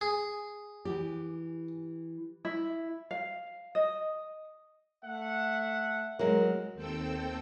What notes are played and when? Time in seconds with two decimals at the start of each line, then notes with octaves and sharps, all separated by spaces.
0.01 G#4
0.85 E3 G4
2.45 E4
3.11 F5
3.75 D#5
5.05 A3 E5 F#5
6.19 F#3 G#3 A#4
6.74 D#2 C4 A4 G5 E6